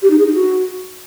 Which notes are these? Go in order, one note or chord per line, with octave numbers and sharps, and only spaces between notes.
G4
D#4
G#4
D#4
F#4